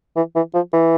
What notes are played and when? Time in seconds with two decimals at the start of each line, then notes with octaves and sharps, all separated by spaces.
0.16 E3
0.36 E3
0.54 F3
0.73 E3